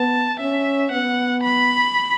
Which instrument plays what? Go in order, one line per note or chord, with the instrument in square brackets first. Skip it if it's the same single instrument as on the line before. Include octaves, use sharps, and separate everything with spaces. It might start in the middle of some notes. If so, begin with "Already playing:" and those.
Already playing: [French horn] B3 [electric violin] A5
[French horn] C#4 [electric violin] E5
[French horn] B3 [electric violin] F#5
[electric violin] B5